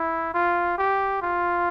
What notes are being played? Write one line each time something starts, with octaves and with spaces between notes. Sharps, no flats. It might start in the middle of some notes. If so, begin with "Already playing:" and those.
Already playing: E4
F4
G4
F4